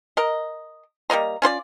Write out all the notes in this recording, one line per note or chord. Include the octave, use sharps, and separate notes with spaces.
A#4 D#5
G3 A#3 D#5 A#5
C#4 F4 C5 D5